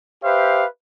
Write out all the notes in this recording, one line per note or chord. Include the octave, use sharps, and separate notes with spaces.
G4 B4 C5 E5 F5